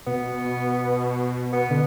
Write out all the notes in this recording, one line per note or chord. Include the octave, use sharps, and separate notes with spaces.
B2 B3
B3
D3